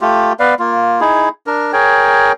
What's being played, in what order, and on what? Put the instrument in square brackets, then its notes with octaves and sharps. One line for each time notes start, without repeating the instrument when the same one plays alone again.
[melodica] A3 F4 G4
B3 B4 D5 F5
A#3 F4
D#4 E4 G#4
D4 A#4
G#4 A#4 C#5 G5